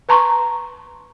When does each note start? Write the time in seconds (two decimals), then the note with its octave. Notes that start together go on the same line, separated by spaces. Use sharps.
0.09 B4 A5 A#5 C6 C#6